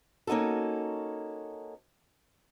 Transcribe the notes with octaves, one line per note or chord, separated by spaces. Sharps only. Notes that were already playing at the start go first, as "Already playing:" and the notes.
A#3 C#4 D#4 F#4 A4